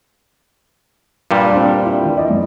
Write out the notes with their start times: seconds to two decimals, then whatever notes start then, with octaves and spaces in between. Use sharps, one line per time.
1.31 G2 A#2 G3
1.50 C4 D4 G5
1.85 E4
2.03 E3
2.16 E4 D5 D#5
2.30 F#2